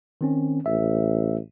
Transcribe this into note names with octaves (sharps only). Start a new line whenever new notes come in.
D#3 C4 C#4
A1 E5